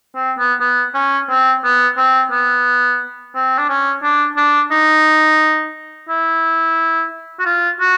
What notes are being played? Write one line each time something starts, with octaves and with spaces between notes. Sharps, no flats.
C4
B3
B3
C#4
C4
B3
C4
B3
C4
D4
C#4
D4
D4
D#4
E4
F#4
F4
F#4